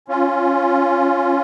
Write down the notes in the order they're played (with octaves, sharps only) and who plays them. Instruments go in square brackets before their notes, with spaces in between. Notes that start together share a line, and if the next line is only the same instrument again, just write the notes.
[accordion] C#4 F4